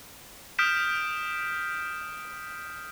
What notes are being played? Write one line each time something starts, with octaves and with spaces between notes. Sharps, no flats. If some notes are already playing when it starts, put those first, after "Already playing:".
D#6 F6 G6 B6 D7 E7